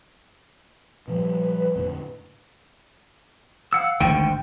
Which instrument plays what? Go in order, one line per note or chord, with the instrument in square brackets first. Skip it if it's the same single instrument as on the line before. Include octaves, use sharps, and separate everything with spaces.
[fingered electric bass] A#2 F3 G3 [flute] B4
[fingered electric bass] F2 A2 D3
[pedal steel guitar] F5 F#5 E6
[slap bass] G#1 D2 D3 [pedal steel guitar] G5 C#6